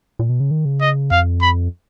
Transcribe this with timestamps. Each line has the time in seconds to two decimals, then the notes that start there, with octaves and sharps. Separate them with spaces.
0.19 A#2
0.30 B2
0.40 C#3
0.51 D#3
0.65 C#3
0.81 D#5
1.11 F2 F5
1.41 B5